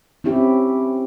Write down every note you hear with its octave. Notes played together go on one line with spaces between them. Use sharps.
C4 C#4 E4 G4